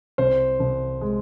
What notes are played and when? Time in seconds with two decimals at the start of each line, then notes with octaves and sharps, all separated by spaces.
0.18 C2 C5
0.60 C2
1.01 G#3